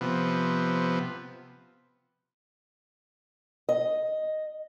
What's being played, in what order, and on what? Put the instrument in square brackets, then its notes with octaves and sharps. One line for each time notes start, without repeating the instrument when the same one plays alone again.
[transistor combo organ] C3 F3 B3
[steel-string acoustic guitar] D#5